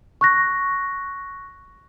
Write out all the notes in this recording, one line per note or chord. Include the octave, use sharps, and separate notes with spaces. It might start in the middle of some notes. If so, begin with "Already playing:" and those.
C#6 F#6 A#6